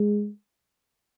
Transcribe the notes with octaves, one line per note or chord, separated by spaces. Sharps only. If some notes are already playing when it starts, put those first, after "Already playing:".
Already playing: G#3